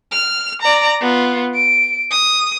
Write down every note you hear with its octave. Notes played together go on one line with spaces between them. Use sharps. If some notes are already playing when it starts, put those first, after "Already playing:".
F6
D5 A#5
B3 F4
D7
D#6